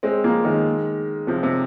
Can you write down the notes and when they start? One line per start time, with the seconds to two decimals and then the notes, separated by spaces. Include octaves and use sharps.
0.03 G#3 C4
0.24 F3 A#3
0.44 D#3 G#3
1.27 C3 F3
1.43 C3